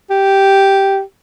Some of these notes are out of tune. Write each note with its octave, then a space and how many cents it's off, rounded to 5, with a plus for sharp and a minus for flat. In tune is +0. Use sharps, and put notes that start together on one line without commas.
G4 -5